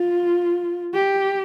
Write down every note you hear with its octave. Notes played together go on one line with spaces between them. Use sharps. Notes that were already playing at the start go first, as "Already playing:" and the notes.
Already playing: F4
G4